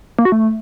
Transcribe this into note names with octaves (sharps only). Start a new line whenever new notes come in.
A#3
F#4
A3